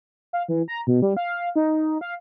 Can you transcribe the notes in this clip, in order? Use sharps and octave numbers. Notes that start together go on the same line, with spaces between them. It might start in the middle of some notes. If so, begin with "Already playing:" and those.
F5
E3
A#5
B2
G3
F5
D#4
F5